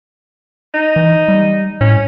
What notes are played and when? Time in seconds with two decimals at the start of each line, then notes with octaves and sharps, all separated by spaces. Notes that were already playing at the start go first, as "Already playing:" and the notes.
0.74 D#4
0.96 E3
1.28 G3
1.81 A2 C#4